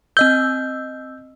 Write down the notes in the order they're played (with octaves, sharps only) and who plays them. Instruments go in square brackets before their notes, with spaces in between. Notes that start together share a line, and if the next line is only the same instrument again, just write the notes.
[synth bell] C4 D#5 E6 [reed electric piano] G6